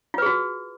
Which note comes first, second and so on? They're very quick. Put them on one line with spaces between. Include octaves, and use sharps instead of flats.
F4 B4 G#4 F#4